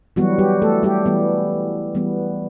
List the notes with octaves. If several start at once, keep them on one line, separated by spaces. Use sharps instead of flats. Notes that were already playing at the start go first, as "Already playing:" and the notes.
E3 F#3 G3 B3 F#4
G3 G4
A3 A4
G3 G4
E3 G3 B3
E3 G3 B3